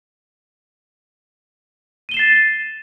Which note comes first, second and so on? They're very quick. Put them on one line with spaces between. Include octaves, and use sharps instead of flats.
D#7 G7 E7 C7 A6